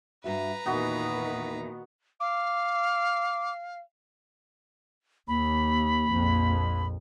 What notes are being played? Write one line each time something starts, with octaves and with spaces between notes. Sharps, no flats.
G2 F#4 B4 E5 A#5
E2 A#2 D#3 B3 D#4 F#4 G#5
F5 D6
D#2 A#3 B5
A#1 F2